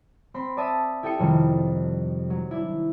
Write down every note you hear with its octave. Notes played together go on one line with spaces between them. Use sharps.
C4 B5 C6
D5 E5 A5 D#6 E6 B6
E4 G4 A4 G5 D#6 C#7
F2 C3 D#3 F#3 G3
F#3
D4 E4